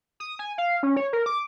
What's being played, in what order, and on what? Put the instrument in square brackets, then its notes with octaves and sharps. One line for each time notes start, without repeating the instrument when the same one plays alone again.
[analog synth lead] D#6
G#5
F5
C#4
C#5
A#4
D6